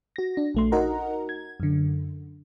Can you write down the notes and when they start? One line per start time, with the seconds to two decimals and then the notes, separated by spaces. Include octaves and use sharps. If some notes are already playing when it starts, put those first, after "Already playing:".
0.16 F#4 A#6
0.37 D4
0.55 A#1 A3 C6
0.72 D#4 F#4 A#4 D#5 F#5 A#5
1.29 G#6
1.60 F#2 D3